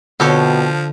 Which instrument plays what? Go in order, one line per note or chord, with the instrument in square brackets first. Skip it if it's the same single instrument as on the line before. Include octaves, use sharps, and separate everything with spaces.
[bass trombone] B2 [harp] D3 [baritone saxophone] F3 [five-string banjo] C4 G4 C#5